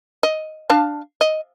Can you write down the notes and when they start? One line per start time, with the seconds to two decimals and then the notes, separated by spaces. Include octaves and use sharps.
0.23 D#5
0.70 D4 F5 A5
1.21 D#5